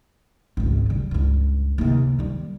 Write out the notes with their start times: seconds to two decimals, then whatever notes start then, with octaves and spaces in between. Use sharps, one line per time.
0.57 G#1 C#2
0.86 C#3 G3
1.11 C#2 G2
1.78 D#2 C3
2.19 D#3 G3